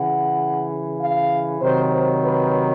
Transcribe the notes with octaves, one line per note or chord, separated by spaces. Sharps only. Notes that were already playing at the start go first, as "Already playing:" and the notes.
Already playing: C#3 E3 F#5
F5
C3 D#3 F#3 C5
C5
B4